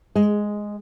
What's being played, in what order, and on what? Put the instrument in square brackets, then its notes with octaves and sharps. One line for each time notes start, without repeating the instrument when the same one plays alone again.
[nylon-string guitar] G#3